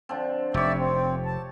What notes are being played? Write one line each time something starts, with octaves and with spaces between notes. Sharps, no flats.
D3 F3 C4
F1 G4 C#5 D5 E5
C4
A5